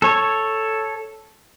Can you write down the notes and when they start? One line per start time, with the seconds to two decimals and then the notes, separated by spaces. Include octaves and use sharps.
0.02 A4 C#5